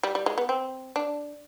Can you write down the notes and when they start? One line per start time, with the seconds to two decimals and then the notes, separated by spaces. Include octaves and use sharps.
0.03 G3
0.15 G3
0.26 G#3
0.38 B3
0.49 C4
0.96 D4